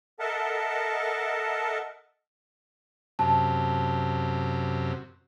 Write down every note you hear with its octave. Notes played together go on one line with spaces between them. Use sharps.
A4 A#4 D#5 E5 F#5 A5
F#2 C3 A5